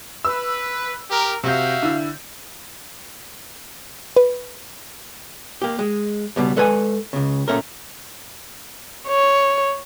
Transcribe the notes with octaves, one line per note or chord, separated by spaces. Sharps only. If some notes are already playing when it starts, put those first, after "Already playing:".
B4 E6
G4 A#4
C3 F#4 E5 F5 G6
D3 E4
B4
A#3 G4
G#3
C#2 B2 G3
G#3 A4 B4 D5 G#5
C#2 C#3
A#2 A3 C#4 A#4
C#5